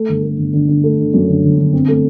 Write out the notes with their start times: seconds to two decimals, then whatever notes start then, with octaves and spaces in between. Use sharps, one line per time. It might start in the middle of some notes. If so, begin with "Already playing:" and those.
Already playing: A3
0.09 G1
0.23 A3
0.38 G1
0.53 D3
0.68 D3
0.84 A3
0.98 D3
1.14 F#2
1.28 D3
1.43 G1
1.58 G1
1.73 C4
1.88 A3